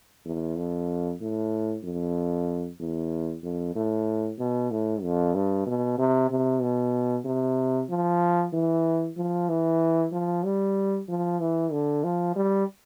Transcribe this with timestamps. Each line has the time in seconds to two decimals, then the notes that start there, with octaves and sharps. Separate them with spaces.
0.25 E2
0.57 F2
1.21 A2
1.84 F2
2.80 E2
3.44 F2
3.76 A2
4.39 B2
4.71 A2
5.03 F2
5.35 G2
5.67 B2
5.98 C3
6.30 C3
6.62 B2
7.26 C3
7.90 F3
8.53 E3
9.17 F3
9.49 E3
10.12 F3
10.44 G3
11.09 F3
11.40 E3
11.72 D3
12.04 F3
12.36 G3